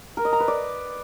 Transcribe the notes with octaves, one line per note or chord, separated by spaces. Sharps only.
A#4
D#5
A#5
B4
D5